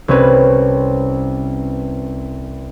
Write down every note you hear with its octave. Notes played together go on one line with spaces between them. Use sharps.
C2 C4 C#4 B4